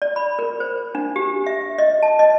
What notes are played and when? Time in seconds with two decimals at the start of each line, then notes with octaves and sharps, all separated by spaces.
0.02 D5
0.16 B5
0.39 A#4
0.60 C5
0.95 D4
1.16 G4
1.46 E5
1.78 D#5
2.03 A5
2.19 D#5